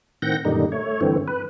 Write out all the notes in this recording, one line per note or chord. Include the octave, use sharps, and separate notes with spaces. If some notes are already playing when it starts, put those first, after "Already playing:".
A2 D#3 C4 F#5 G6 A#6
F#2 A#2 D3 D#3 G3 D#4
A3 C#5
G2 D3 E3 C4
B4